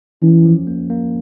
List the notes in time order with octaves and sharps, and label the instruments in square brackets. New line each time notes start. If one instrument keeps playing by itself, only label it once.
[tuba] E3 [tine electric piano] C#4
[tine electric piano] F3
A#3
A#3